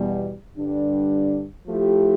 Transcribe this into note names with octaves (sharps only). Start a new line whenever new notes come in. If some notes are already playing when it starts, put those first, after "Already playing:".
Already playing: E2 B2 G3
G2 D3 G3 D4
F3 A3 E4 G4